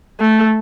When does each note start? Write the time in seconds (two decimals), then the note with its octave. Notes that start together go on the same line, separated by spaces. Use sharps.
0.20 A3